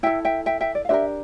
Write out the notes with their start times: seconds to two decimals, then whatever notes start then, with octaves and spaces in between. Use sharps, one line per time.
0.03 E4 A4 E5 G5
0.25 E5 G5
0.46 E5 G5
0.61 E5 G5
0.75 D5
0.85 F5
0.89 D4 G4 A#4 C5 E5